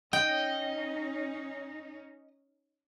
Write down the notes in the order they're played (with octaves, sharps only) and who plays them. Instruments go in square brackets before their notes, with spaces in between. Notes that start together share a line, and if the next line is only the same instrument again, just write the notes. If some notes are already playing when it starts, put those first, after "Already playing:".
[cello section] C#4 D#4 [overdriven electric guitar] D#5 [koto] G5